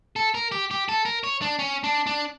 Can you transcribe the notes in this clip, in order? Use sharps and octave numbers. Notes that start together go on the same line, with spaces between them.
A4
A#4
G4
G4
A4
A#4
C#5
D4
C#4
D4
D4